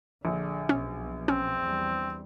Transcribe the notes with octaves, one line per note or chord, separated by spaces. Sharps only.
A#1 D3
B1 B2 C#4
C4 C#4
E2 G3